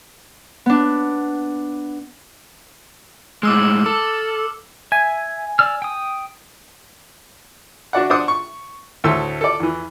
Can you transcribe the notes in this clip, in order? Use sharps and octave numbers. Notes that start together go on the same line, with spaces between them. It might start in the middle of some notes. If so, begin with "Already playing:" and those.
B3 D4
A2 G#3 D6 E6 F6
A4 E6
E5 G#5
D5 E6 F6
G5 D#6
D4 F#4 D5 F#5
D4 C5 F#5 D#6
C#6
D2 A2 A3 A4 C6 E6
A4 D5
E2 E3